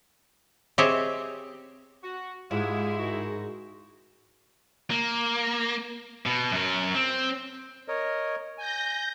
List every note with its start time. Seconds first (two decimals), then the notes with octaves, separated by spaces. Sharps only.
0.78 C4 G4 G#4 C#5 D#5 E5
2.02 F#4
2.51 G#2 G#3 E4 F4 G4 G#4
2.99 D#3 D#4 F#4
4.90 A#3
6.26 B2
6.52 F#2 A#4
6.94 C4
7.88 A#4 C#5 D#5
8.58 G#5 G6 A#6